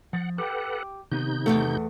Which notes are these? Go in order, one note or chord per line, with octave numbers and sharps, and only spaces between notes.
F3 F#5
G4 A4 B4 F#5 G5
C3 D#3 B3 D#4 G6
E2 G2 A3